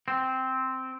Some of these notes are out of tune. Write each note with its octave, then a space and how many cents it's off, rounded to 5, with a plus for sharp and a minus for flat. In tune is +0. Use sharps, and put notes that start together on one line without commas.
C4 -5